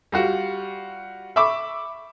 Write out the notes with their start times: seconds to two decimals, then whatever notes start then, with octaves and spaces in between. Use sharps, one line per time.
0.12 G3 F4 F#4
1.36 E5 B5 C#6 D6 E6